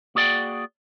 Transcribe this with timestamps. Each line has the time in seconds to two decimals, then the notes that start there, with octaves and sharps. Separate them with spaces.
0.15 A#3 F#4 G#4 D5 F#5 G5